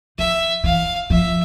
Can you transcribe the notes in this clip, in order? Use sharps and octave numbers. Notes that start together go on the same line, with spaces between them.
F3 E5
E3 F5
F3 E5